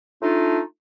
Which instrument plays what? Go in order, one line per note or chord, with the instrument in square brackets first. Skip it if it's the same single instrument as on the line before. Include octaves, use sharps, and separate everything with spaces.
[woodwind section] A3 D4 D#4 F4